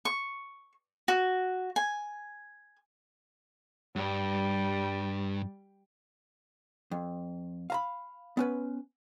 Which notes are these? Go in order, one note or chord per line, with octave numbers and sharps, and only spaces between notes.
C#6
F#4
G#5
G2 G3
F2
F5 A#5 B5
B3 C#4 B4